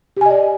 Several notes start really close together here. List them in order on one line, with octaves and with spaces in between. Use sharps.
G4 G#5 D#5 D5